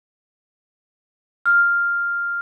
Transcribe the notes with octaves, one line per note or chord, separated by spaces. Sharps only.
F6